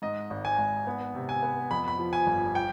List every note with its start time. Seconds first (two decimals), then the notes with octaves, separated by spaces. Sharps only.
0.02 G#2 D#5
0.30 G#1
0.45 G#5
0.58 G#1
0.87 B3
1.14 C3
1.29 G#5
1.43 B3
1.71 F2 B5
1.88 B5
1.99 F3
2.13 G#5
2.27 G1
2.55 G5